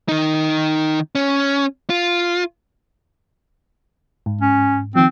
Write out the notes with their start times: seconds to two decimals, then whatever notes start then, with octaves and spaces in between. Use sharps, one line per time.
0.09 D#3 D#4
1.15 C#4
1.90 F4
4.26 G#2
4.41 C#4
4.95 D#3 F3 C4